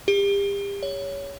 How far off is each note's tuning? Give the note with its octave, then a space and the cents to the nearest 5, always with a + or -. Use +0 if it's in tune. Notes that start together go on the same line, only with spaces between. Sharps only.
G4 +35
C#5 +15